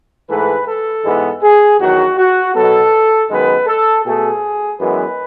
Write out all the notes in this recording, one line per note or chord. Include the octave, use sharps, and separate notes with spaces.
G#2 E3 A3 B4
A4
G#2 E3 G#3 B3
G#4
E2 D#3 F#3 F#4
F#4
B2 F#3 B3 A4
F#2 D#3 G#3 B3 B4
A4
B2 A3 G#4
F#2 E3 G#3 B3 B4